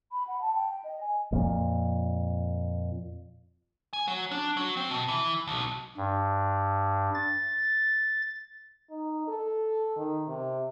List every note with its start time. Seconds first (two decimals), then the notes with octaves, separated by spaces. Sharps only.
0.12 B5
0.27 F#5
0.41 A5
0.55 G5
0.84 D#5
1.01 G#5
1.32 F2 A#2
3.93 G#5
4.08 F#3
4.31 D4
4.57 F#3
4.77 C4
4.91 B2
5.08 E3
5.47 B1
5.97 G2
7.15 A6
8.90 D#4
9.27 A4
9.97 D#3
10.28 C3